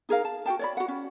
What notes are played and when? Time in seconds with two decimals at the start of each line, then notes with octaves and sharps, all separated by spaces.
0.09 D#4 G#4 A#4 F5
0.25 A5
0.46 F#4 G#4 G5 A5
0.59 C#5 D5 B5
0.77 F#4 F#5
0.88 C#4